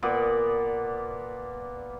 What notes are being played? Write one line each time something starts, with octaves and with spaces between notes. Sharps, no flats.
A#2 B3 D5